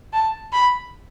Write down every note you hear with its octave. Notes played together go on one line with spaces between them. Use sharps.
A5
B5